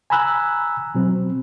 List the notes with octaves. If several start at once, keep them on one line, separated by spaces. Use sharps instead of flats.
G#5 A#5 B5 E6 F#6
B2 F#3 C4